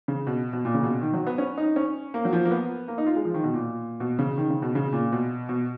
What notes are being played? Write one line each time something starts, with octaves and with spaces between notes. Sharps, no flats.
C#3
B2
B2
A#2
C#3
B2
D#3
F#3
B3
C#4
D#4
C#4
A#3
F#3
F3
A#3
B3
A#3
D#4
F4
G#3
F3
D#3
B2
A#2
B2
C#3
D#3
C#3
B2
C#3
A#2
B2
B2